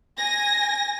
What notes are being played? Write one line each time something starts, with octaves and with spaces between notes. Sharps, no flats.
G#5 A#6